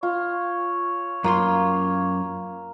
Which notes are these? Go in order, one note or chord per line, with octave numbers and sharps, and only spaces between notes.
F4 C#5
F#2 A#3 F4 C6